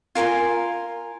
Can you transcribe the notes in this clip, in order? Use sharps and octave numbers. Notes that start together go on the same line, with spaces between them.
F4 A#4 G#5 C6